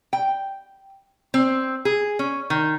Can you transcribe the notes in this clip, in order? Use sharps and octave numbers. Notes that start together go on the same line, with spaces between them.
G5
C4
G#4
C#4
D#3